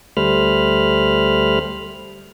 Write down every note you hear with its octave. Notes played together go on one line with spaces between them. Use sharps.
D2 G3 A3 C5 B5 F6